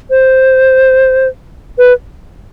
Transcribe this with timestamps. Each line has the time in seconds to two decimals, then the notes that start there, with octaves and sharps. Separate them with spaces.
0.10 C5
1.78 B4